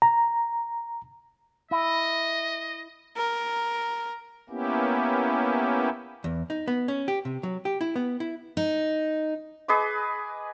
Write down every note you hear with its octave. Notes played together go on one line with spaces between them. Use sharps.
A#5
E4 D#5
A#4
A#3 B3 C#4 E4 G4
E2
D#4
B3
C#4
G4
C3
F#3
G4
E4
B3
E4
D#4
G#4 B4 D#5 D6